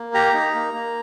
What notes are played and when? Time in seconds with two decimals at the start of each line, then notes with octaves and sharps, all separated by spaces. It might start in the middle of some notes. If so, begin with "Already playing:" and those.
Already playing: A#3
0.14 G4 A#5
0.34 D#4
0.55 A#3
0.74 A#3